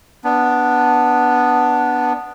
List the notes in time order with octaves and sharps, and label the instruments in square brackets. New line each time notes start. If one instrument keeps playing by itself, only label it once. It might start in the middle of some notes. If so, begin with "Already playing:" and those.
[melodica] B3 D4